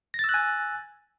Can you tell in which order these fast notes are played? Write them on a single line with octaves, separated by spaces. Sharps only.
A#6 A6 E6 F#6 G#5